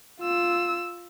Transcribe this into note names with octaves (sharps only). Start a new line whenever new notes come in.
F4 E6